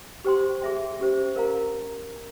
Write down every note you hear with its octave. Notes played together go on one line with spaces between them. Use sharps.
G4 C5 G5 C6
G#4 E5 G5
C#4 G4 C5
A#4 F5 A#5